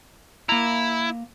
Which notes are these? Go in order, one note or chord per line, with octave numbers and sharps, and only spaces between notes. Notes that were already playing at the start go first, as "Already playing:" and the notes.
A#3 E4 A#5